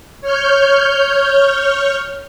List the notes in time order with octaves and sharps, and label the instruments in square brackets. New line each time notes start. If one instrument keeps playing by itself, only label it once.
[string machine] C#5 F6 G6